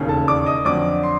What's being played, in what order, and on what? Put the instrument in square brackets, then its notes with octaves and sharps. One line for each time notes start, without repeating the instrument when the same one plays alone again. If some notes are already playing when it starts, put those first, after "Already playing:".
Already playing: [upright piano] E1 D#2 C#3
A4 A5
D5 D6
D#5 D#6
F2 D3 F#3 D5 D6
C6